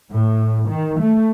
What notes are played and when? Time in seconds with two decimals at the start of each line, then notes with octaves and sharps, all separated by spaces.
0.13 A2
0.69 D#3
1.00 A3